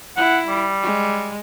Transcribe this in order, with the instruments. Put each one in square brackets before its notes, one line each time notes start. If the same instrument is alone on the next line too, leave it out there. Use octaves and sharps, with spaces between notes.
[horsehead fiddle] E4 [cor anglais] F#5
[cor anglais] G3
[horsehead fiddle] G#3